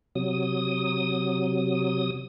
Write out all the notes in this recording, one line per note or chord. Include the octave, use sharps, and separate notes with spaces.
C3 F#3 D#6